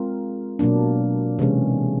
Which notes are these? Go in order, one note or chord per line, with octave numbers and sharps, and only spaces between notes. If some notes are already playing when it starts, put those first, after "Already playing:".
Already playing: G#3 C4 F4 A#4
B2 F#3 A#3 D4
C3 E3 G#3 C#4